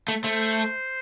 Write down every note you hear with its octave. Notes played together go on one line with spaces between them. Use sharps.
A3
A3 C5